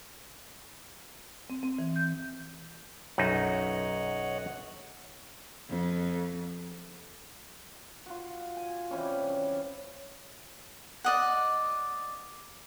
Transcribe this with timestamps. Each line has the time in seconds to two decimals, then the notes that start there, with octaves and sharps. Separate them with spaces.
1.50 C4
1.63 C4
1.79 E3
1.96 G6
3.18 B1 F#2 D#4 C#5 D#5 F#5
5.69 F2
8.06 F4 F#4
8.57 G#5
8.91 C3 E3 G3 C#4
9.29 C#4
11.04 D5 D#5 F#5